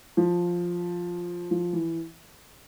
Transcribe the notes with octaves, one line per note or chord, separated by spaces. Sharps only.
F3
F3
E3